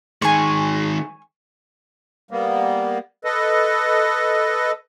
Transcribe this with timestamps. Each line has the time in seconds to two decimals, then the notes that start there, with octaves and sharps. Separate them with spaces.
0.22 D#3 G#3 G#5 C#6
2.31 G3 A#3 B3
3.25 A4 B4 D#5